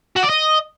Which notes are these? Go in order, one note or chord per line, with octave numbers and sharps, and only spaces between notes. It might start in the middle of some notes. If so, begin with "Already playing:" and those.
F#4
D5
D#5